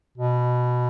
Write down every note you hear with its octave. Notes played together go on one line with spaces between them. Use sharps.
B2